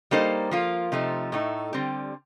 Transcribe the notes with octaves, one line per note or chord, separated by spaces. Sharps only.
G3 A#3 D#4 A4 C5
F3 A#3 F4
C3 F3 A3 D#4
A2 A3 D#4
D3 G3 C4 G4